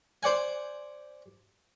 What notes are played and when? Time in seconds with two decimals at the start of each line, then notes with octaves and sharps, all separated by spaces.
0.23 C5 D5 F#5 G#5